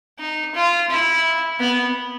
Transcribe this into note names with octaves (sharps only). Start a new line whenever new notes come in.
D#4
F4
E4
B3